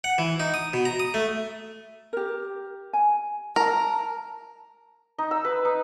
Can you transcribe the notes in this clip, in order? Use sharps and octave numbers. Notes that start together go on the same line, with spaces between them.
F#5
E3
D#4
D#6
B2
A#5
D#6
A3
G4 A#4
G#5
A#4 A5 A#5
D#4
E6
B4
D#4